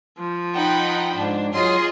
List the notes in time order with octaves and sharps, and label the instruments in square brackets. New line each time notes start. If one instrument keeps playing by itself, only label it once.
[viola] F3
[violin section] D#4 G5 B5 [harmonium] F#5
[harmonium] G#2 [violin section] D4
[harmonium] F#3 [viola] F4 [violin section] G#4 D#5 C6